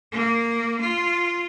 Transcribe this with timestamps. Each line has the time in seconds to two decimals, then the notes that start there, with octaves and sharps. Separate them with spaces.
0.12 A#3
0.81 F4